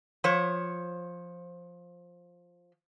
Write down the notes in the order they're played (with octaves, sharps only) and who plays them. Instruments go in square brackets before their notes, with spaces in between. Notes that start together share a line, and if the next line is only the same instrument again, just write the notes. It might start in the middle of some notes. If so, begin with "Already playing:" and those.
[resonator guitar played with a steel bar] F3 C5 C#5